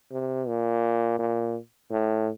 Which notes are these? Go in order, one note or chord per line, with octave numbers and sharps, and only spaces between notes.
C3
A#2
A#2
A2